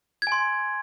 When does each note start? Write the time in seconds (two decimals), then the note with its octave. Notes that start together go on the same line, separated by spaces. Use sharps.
0.22 G#6
0.27 G#5
0.32 C6